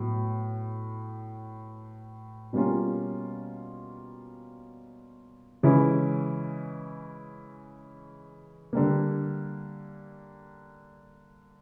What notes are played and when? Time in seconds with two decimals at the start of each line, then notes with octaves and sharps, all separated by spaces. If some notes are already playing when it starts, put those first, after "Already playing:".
Already playing: A2 F#3 B3
2.53 B2 G3 A#3 C#4 F4
5.63 C#3 E3 G#3 C#4 E4
8.73 D3 G3 A#3